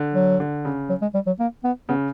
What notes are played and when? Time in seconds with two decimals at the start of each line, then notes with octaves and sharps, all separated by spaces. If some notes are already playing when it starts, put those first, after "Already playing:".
Already playing: D3
0.15 F#3
0.40 D3
0.65 C#3
0.90 F#3
1.02 G#3
1.14 G3
1.27 F#3
1.39 A#3
1.64 B3
1.89 C#3 B3